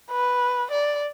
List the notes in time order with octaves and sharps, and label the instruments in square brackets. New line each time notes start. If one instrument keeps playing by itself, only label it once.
[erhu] B4
D5